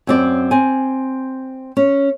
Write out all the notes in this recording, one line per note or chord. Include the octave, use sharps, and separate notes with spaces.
F#2 C4 D5
C4 G#5
C#4